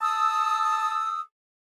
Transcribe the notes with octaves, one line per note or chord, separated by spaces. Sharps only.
A5 D#6 E6